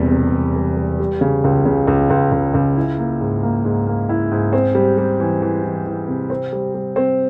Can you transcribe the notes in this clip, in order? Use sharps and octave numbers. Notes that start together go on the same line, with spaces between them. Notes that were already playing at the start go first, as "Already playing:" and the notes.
Already playing: E1 E2 C3 G3
C3
E1
G3
G3
G3
C#3
C#2
C#3
C#2
C#2
C#2
C#2
E4
A#3
G#2
A#3
G#2
A#3
E4
G#2
C4
G3
G3
E3
E3
E3
E3
C3
C4
G3
G3
C4